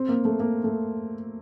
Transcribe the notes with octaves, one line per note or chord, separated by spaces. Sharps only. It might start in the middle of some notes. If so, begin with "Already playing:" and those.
Already playing: C4
A#3
A3
A#3
A3